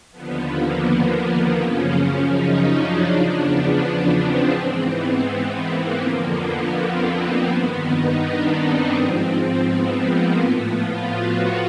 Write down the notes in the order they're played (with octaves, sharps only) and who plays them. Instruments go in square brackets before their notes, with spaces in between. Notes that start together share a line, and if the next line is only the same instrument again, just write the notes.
[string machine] D#2 D3 F3 B3
A#3
B3
B3
F#2 C#3 F3 C#4
D#4
D4
E2 C#3 F3 D4
B3
B3
C4
G#2 E3 C4
B3
B3
A#3
F2 D3 F3
B3
C4
B3
G2 D#3 B3
D#4
D4
C4
G#2 F3
B3
A#3
A2 F3 B3
F4
F#4